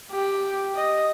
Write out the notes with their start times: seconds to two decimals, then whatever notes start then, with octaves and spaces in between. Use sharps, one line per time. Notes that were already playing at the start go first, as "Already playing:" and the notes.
0.11 G4
0.76 D#5